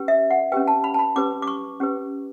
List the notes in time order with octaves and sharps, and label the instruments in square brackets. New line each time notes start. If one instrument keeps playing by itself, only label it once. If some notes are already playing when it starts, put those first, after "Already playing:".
Already playing: [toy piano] C#4 G4 B4
E5
F#5
C#4 G4 B4 G5
A5
B5
A5
B5
C#4 G4 B4 D6
D6
C#6
C#4 G4 B4